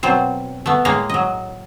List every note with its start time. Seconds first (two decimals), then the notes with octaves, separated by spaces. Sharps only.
0.03 B2 F#3 C4 C5
0.66 A3 B3
0.85 A2 G#3 A#3 F5 A#5
1.10 F#3 D#5